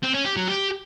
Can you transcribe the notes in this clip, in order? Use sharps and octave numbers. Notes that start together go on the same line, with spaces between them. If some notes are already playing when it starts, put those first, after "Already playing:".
C4
C#4
G4
F#3
G4